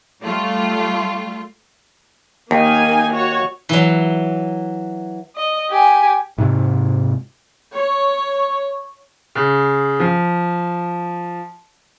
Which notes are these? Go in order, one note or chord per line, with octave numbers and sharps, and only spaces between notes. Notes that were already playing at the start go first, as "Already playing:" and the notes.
G3 A3 F4
D#2 A#3 D#4 G#5
F#4 C#5
E3 F#3
D#5
G4 G#5
G#2 C3
C#5
C#3
F3